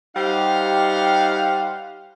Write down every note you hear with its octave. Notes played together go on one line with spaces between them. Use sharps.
G3 D#4 G4 C5 F5 F#5